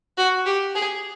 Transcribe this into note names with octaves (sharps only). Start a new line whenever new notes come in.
F#4
G4
G#4